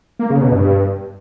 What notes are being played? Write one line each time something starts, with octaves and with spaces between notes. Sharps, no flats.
A#3
C#3
B2
G2